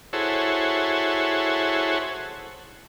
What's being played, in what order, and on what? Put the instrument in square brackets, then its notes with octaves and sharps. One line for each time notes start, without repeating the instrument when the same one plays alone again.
[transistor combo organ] E4 F#4 G#4 A4 C5 C#5